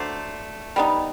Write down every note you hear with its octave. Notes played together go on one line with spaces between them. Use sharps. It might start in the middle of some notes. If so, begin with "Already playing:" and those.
Already playing: F#3 A3 D4 C5
G3 B3 D#4